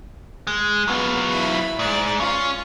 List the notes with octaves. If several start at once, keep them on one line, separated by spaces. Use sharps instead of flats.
G#3
F#3 B3 F4
E4 B5
G#2 D5
C#4 F4